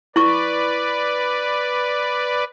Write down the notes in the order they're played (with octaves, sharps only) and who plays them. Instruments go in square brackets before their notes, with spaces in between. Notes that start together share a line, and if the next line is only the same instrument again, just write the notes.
[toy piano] E4 C#6 [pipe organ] B4 D5